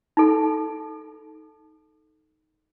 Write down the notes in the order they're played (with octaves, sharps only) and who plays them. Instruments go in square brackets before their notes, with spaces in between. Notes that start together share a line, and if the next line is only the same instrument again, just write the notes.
[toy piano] D#4 A4